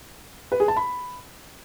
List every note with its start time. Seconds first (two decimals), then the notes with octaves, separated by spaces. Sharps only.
0.52 B4
0.60 G#4
0.68 A5
0.76 B5